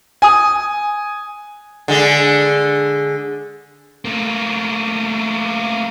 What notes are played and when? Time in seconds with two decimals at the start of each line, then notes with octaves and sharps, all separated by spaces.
0.22 G#5 D#6
1.88 D3 G#3
4.05 A3 A#3